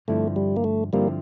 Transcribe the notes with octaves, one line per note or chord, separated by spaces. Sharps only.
G2 D3 F3 A3 C4 E4
G3
A#3
A3
G2 D3 F3 G3 A#3 C4 E4